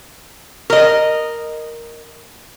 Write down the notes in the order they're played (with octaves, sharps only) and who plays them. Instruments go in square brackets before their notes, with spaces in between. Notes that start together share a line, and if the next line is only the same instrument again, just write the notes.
[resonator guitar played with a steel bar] A#4 D#5